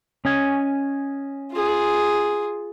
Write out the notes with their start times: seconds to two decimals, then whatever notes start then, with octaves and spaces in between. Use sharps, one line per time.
0.25 C#4 D#5 G#5
1.52 F4 G#4